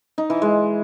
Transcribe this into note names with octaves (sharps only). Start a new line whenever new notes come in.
D#4
E3
G#3